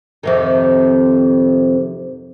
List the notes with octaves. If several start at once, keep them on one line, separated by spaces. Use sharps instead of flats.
F2 C3 D#3